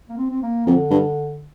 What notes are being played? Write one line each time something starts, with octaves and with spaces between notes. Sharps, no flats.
A#3
C4
C4
A#3
F2 D3
G2